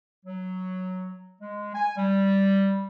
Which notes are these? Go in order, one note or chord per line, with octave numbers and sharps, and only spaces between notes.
F#3
G#3
G#5
G3